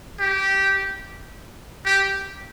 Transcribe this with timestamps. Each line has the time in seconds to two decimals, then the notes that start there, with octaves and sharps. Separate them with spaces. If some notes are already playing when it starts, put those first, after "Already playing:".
0.19 G4
1.86 G4